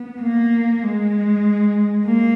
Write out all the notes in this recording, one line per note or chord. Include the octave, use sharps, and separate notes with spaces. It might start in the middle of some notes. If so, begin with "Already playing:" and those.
Already playing: B3
A#3
G#3
A#3